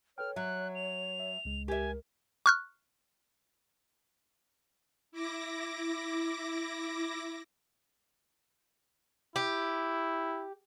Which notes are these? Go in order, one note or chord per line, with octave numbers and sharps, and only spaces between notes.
A4 B4 C#5 G5 F6
F#3 E5 F#6
F7
E5
C#2 G#3
G4 A#4 E5 G#5
C#6 F6 F#6
E4 D6 A#6
E4 G4